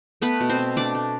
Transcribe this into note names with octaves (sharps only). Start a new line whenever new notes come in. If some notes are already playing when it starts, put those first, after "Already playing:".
A3 B3 B4
B2
C4 C5
B2
A3 D4 D5
A3